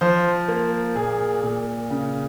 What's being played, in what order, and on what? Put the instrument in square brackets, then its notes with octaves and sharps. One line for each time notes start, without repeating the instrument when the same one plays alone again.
[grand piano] F3 C5
A#3
A#2 G#4
A#2
C#3